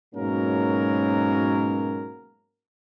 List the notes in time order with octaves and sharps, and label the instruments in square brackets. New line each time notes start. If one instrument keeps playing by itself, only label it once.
[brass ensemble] G#2 B2 F#3 A#3 C#4 A#4